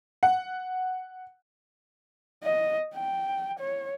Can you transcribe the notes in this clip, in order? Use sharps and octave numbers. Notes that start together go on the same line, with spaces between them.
F#5
D#5
G5
C#5